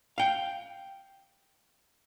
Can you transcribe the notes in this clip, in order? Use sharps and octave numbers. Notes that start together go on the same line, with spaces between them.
F5 G5